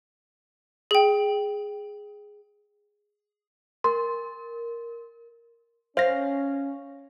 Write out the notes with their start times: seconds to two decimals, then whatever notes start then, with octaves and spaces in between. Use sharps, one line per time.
0.91 G#4 G5
3.84 A#4 C6
5.97 C#4 C5 F5 A#6